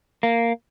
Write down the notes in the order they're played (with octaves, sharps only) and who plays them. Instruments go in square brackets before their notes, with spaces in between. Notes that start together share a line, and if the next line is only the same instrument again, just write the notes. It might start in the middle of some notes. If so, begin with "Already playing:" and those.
[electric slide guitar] A#3